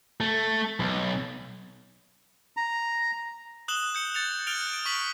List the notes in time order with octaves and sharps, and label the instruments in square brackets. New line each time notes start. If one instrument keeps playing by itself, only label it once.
[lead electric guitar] A3
B1
[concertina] A#5
[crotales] D#6 F#6 E7 F#7 G7
G6 C#7 F#7
G6 A6 C#7 F7
F6 F#6 A6 D7 F7 G7
D7
C#6 B6 F#7